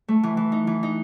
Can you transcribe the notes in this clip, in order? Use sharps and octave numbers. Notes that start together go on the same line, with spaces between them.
A3
E3
E3
D#4
E3
D#4